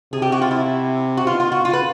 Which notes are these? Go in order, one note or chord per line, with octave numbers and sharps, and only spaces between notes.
C3 G#4
G4
F#4
F4
E4
F#4
B2 F4
F4
F#4
F4
B4